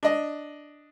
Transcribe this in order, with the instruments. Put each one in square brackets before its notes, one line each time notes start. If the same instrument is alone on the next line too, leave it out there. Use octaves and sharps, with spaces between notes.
[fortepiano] D4 D#5